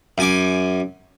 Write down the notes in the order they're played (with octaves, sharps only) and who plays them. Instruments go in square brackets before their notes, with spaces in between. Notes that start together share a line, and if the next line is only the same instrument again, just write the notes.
[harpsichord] F#2 G#5 D6